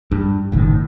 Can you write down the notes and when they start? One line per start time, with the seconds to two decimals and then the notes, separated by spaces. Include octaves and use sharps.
0.11 G2
0.52 F#1 A2 D#3